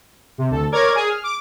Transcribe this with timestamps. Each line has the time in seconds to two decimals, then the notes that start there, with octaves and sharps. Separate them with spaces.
0.38 C3
0.51 D2 A4
0.72 A#4 C#5 D5 D6 F6 G#6
0.95 G#4
1.09 F6
1.24 D6